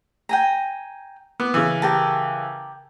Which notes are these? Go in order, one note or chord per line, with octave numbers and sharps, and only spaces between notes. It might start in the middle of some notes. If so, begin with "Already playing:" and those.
G5 G#5 A#5
B3 D6
C#3 E3
G4 A#4 A5